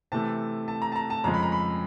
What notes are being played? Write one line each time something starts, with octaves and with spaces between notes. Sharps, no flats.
C3 E3 A3 A5
A5
A#5
A5
A#5
A5
F2 C#3 F3 G#3 A#5
B5
A#5
B5